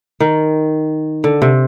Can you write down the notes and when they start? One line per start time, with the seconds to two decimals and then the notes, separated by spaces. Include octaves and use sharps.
0.20 D#3
1.24 D3
1.42 C3